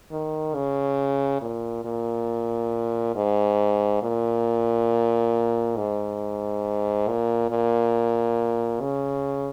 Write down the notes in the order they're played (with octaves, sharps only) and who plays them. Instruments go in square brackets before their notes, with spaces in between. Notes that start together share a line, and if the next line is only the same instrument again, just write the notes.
[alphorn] D#3
C#3
A#2
A#2
G#2
A#2
G#2
A#2
A#2
C#3